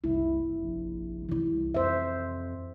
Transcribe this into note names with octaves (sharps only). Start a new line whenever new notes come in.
F#1 C2 C3 E4
A#1
C3 E3 E4
C2
F2 C5 E5